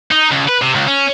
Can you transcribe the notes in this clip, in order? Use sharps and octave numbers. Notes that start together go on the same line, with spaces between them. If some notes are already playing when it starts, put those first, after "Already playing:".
D#4
C#2
B4
C3
C#2
C#4